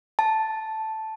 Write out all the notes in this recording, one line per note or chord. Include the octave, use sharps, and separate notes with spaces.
A5